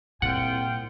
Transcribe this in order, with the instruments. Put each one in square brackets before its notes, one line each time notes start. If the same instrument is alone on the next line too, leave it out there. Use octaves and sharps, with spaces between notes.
[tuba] C2 [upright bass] A#2 [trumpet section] G#3 F4 G5 [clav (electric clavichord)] F#5